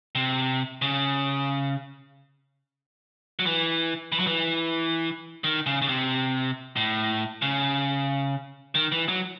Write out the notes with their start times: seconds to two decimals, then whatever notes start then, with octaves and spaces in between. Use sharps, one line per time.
0.15 C3
0.82 C#3
3.39 F#3
3.46 E3
4.12 E3
4.19 F#3
4.27 E3
5.44 D#3
5.66 C#3
5.82 C#3
5.89 C3
6.77 A2
7.42 C#3
8.75 D#3
8.92 E3
9.08 F#3